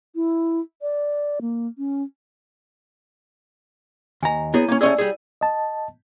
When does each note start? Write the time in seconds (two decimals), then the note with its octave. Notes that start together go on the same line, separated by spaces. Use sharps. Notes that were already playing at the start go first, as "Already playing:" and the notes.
0.15 E4
0.82 D5
1.41 A#3
1.78 C#4
4.23 D#2 G#5 A#5
4.54 B3 E4 G#4 C#5
4.68 A#3 C#4
4.81 A3 C#4 G#4 D5 E6
4.98 G3 G#4
5.41 D#5 A5